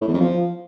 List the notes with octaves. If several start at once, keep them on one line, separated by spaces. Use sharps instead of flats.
A2
E2
F2
F3